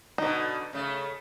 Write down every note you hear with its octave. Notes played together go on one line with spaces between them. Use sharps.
B2 D3 D#4
C#3 A3